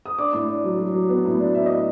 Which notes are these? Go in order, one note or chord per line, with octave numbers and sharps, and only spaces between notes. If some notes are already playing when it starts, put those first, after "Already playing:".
D#6
D4 D6
A2
D4
F#3
F#3
F#3
B3
A2
D4
D4 E5
D#5
A2